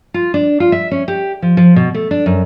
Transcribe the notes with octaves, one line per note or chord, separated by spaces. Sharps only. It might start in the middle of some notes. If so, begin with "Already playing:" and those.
F4
D4
F4
E5
C#4
G4
F3
F3
B2
A3
D4
F#2